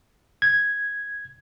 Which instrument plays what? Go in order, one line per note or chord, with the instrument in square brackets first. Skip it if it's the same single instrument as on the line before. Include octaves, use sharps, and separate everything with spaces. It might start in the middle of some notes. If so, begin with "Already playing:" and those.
[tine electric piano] G#6